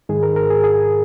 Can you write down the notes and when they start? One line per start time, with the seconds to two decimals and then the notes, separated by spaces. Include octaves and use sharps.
0.09 G#2 D#3 G#3 G#4
0.23 A#4
0.36 A#4
0.50 G#4
0.64 G#4